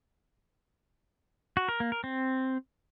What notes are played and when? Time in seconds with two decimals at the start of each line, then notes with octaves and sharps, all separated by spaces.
1.57 F#4
1.69 A#4
1.80 A#3
1.92 A#4
2.04 C4